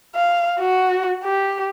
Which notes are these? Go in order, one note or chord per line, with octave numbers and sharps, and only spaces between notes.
F5
F#4
G4